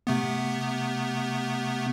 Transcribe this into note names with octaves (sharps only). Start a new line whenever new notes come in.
C3 A3 B3